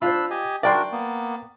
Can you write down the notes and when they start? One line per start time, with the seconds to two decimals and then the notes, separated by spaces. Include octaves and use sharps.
0.02 D4 F4 C5 B5 E6
0.30 G4 D#5 G#5
0.63 D4 F#4 A#4 D5 G5 C6
0.92 A#3 B3